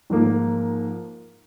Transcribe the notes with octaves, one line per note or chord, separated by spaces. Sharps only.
G#2 F3 A#3